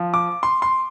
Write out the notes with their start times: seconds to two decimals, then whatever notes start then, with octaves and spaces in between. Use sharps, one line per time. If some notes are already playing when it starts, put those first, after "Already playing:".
Already playing: F3
0.14 D6
0.43 C6
0.62 C6